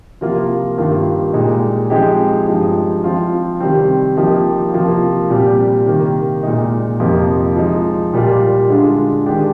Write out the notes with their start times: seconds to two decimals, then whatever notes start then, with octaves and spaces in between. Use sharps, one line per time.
0.21 C3 F3 A#3 F4
0.78 G2 D#3 A#3 F4
1.33 A#2 G#3 D#4 G4
1.90 F3 G#3 C4 D#4 G4
2.48 G2 F3 G#3 D#4
3.04 F3 C4 F4
3.60 C3 D#3 G3 C4
4.17 F3 A#3 D#4 G4
4.73 C3 F3 A#3 F4
5.30 A#2 G3 C4 G4
5.86 C3 D#3 A#3
6.43 A#2 G#3 D#4
7.00 F2 C3 F3 A#3 D#4
7.56 F3 G#3 D#4
8.13 A#2 G3 A#3 F4
8.70 D3 G#3 D4 F4
9.26 D#3 G#3 D4 G4